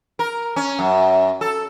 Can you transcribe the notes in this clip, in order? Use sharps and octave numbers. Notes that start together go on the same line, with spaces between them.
A#4
C#4
F#2
A4